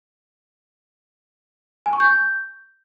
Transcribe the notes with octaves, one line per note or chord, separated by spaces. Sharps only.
G#5
C#6
G6